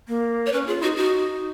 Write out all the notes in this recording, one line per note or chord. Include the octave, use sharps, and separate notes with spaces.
A#3
C#5
C#4 B4
F4 G#4
D#4 F#4
D#4 F#4